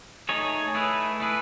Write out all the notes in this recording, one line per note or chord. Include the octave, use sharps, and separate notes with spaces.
A3 D#4 G#4 C#5
A3 E4 G#4 B4
A3 E4 G#4 B4